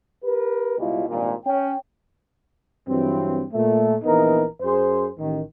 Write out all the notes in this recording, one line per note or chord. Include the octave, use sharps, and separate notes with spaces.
G4 A#4 B4
C#2 B2 G3 E4 F4
G#1 G2 A#2
C#4 G5
G2 E3 F#3 C4
A#2 A3
A#1 E3 B3 D#4 A#4
F#2 G#4 C5
A1 D#3